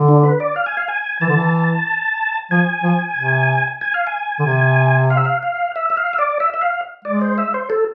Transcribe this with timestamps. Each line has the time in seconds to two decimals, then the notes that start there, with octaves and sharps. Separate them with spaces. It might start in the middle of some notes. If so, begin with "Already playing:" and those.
Already playing: D3
0.08 D4
0.23 B4
0.40 D5
0.56 F5
0.66 G#5
0.77 F5
0.88 G#5
1.21 E3 A5
1.29 D3
1.36 E3
2.51 F3 G#5
2.83 F3
3.16 C3
3.81 G#5
3.94 F5
4.07 G#5
4.39 D3
4.46 C3
5.10 F5
5.17 E5
5.25 F5
5.43 F5
5.76 E5
5.90 E5
5.97 F5
6.13 E5
6.19 D5
6.40 E5
6.54 E5
6.61 F5
7.05 G#3 D5
7.21 C5
7.38 E5
7.54 C5
7.70 A4